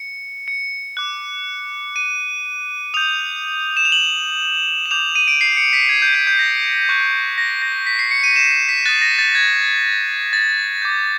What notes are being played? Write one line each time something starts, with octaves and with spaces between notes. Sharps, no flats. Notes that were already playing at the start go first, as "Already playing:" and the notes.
Already playing: C#7
C#7
D6 F#6
D#7
D#6 G6 F7
E7
F7
F#7
E7
D6 G6 F7
D#7
D7
C7
C#7
B6
G#6
G6
G6
G6
A#6
C#6 F#6
A#6
A#6
B6
C7
C#7
D#7
E7
B6
D#6 F#6 A6
A#6
A6
G#6
A6
D6 G6